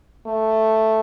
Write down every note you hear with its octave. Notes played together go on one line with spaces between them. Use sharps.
A3